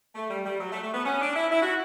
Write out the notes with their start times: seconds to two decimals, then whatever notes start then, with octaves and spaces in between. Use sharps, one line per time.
0.15 A3
0.30 G3
0.46 G3
0.60 F#3
0.72 A3
0.83 A3
0.94 B3
1.05 C#4
1.21 D4
1.36 E4
1.51 E4
1.62 F#4